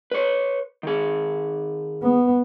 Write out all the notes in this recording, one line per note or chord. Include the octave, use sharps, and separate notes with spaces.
B4 C#5
D#3 G#4
B3